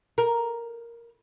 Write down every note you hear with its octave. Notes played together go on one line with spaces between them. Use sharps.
A#4